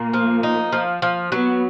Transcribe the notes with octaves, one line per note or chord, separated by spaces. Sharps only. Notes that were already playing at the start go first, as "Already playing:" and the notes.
Already playing: A#2 A#3
F3
D#4
F3
F3
F#3 B3